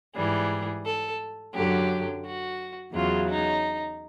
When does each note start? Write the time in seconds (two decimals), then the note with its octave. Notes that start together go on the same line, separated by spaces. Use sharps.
0.15 G#2 E3 G3 G#4
0.84 A4
1.53 F#2 D3 F#3 G4
2.24 F#4
2.93 E2 C#3 F#3 F4
3.28 D#4